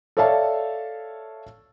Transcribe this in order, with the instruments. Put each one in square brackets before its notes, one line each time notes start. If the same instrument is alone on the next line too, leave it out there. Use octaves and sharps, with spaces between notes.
[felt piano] A4 C#5 D5 E5 F5 A5